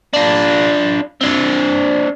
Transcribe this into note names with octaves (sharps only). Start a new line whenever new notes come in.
D4 F4
C4 D4